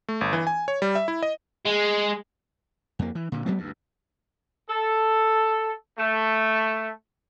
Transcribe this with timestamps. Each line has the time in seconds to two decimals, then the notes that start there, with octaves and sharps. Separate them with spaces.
0.08 A3
0.21 G1
0.33 E3
0.47 G#5
0.68 C#5
0.82 G3
0.95 E5
1.08 E4
1.23 D#5
1.66 G#3
2.99 F2 A#3
3.15 E3
3.32 A#2 D3
3.46 F#3 G#3 B3 C4
3.58 D2 G2
4.69 A4
5.98 A3